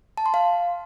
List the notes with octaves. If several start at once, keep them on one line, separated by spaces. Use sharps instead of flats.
A5
C6
F5